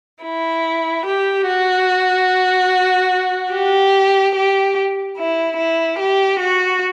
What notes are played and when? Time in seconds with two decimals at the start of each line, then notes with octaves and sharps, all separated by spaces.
0.24 E4
1.06 G4
1.48 F#4
3.53 G4
4.34 G4
5.17 E4
5.57 E4
5.99 G4
6.39 F#4